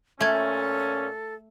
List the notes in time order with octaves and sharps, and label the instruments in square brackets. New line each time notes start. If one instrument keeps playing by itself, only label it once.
[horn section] A#2 C#4 [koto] A3 [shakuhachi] A4 [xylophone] E5 G#6